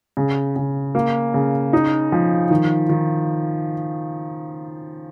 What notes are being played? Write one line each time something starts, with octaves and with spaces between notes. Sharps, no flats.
C#3
C#3
A#3
C#3
D#4
F3
D#3
D#3